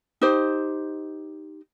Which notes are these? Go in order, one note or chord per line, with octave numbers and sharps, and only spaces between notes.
D#4 G4 C5